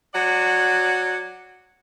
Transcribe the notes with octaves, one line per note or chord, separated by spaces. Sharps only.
F#3 D5 F#5